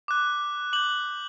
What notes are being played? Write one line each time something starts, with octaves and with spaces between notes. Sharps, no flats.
D6 F#6
D6 G6 F#7